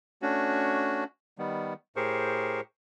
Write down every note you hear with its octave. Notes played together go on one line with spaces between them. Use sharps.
A3 C#4 D4 F#4
D#3 G3 B3
A2 G4 G#4 A#4 C5 C#6